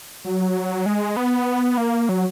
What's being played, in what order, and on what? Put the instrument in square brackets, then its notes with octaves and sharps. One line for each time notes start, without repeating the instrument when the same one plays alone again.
[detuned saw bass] F#3
G#3
B3
A#3
F#3